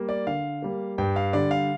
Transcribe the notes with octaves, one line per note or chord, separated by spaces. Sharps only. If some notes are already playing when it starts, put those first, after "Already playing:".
Already playing: G3 A#3
D5
D3 F5
G3 A#3
G2 G5
F5
D3 G3 D5
F5